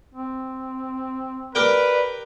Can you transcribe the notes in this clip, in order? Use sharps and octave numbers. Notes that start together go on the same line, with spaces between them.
C4
G4 A#4 B4 D5 G5